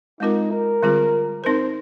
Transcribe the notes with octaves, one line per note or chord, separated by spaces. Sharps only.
G#3 C4 D#4 F4 A#4
A#4
D3 G3 C4 F4 G#4
C4 D#4 A#4 C5